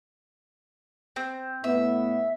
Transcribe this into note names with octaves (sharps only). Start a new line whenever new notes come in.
C4
A2 B3 E5